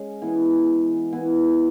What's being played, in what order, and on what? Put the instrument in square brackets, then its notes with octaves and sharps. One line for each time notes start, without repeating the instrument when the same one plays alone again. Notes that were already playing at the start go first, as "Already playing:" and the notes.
Already playing: [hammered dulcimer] G#3 C#4 G#4
E3 B3 E4
E3 B3 E4